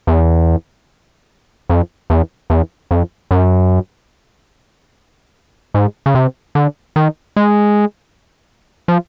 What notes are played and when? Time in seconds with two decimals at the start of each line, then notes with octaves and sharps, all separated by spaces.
0.07 E2
1.69 F2
2.10 E2
2.50 E2
2.91 F2
3.31 F#2
5.74 G#2
6.06 C#3
6.15 C3
6.55 D3
6.96 D#3
7.36 G#3
8.88 F3